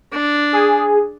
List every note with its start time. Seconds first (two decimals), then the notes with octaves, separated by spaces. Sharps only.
0.13 D4
0.53 G#4